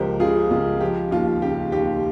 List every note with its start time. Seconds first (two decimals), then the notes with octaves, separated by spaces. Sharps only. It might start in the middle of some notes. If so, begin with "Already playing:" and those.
Already playing: C#2 F3 G4 A#4 C5
0.20 C#3 F4 G#4
0.50 C#2 F4
0.80 F3 G4
1.11 D#2 F4
1.42 C#3 G4
1.72 D#2 G4